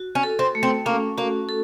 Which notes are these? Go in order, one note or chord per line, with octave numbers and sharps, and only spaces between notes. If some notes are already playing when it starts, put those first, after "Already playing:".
Already playing: F#4
C#4
A4
C4
A3
C4
A#3 C#4
A#3 F#4
A4